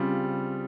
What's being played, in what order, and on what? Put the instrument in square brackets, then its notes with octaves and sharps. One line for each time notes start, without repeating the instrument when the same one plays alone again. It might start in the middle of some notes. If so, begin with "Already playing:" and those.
Already playing: [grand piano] C#3 G3 C4 F4